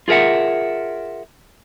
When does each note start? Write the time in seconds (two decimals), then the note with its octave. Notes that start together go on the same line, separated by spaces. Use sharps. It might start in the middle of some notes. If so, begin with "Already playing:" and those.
0.08 F4 G#4 A#4 E5 F#5